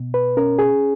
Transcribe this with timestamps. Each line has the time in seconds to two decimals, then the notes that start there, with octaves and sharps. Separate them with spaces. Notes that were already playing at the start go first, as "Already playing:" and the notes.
Already playing: B2
0.14 B4
0.37 C#4 A#4
0.59 G#4